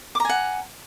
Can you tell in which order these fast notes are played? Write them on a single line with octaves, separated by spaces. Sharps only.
D6 A#5 G#5 F#5